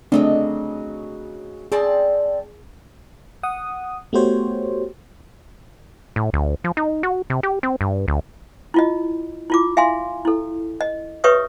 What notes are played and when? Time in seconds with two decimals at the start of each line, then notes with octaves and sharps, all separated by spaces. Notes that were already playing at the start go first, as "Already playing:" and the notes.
0.12 C#3 F#3 A3 C4 D4 D#5
1.72 C4 G#4 D5 A5
3.43 F#5 D#6
4.13 A3 B3 F#4 G4 C5 C#5
6.16 A2
6.33 D2
6.64 F3
6.77 D#4
7.03 F#4
7.30 C3
7.43 G4
7.63 C4
7.81 G2
8.08 D2
8.74 E4 F4 D#5
9.50 E4 F4 D6
9.77 E5 F5 G#5 C6
10.25 E4 A4
10.81 D#5
11.24 G4 B4 C#5 E5 C#6 D#6